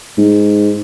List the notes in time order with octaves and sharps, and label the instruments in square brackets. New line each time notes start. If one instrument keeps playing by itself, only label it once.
[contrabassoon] G#2